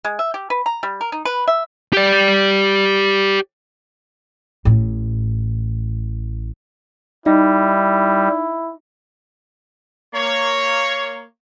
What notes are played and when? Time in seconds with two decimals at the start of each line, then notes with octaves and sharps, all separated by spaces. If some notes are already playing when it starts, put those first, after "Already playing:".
0.05 G#3
0.19 E5
0.34 G4
0.50 B4
0.66 A#5
0.83 G3
1.01 A#4
1.12 D#4
1.25 B4
1.48 E5
1.93 G4 D5
4.65 A1 A2
7.26 G3 D#4 E4
10.14 A#3 C#5